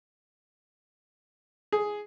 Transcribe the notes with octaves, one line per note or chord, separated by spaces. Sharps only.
G#4